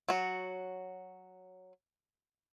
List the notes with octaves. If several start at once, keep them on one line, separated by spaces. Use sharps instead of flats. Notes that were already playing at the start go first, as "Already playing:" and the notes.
F#3 F#4